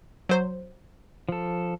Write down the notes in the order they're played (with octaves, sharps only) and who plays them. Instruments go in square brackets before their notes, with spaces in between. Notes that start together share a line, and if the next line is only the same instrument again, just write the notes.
[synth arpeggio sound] F#3 C5
[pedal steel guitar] F3 A4